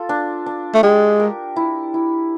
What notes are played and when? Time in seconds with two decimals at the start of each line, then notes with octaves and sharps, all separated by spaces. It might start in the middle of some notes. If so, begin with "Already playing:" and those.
Already playing: F4 A4
0.09 D4
0.46 D4
0.74 A3
0.83 G#3 G4
1.20 A#4
1.56 E4
1.94 E4